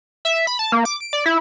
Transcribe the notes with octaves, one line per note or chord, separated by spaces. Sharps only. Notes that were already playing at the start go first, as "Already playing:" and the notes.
E5
B5
A5
A#3
D6
D7
D5
E4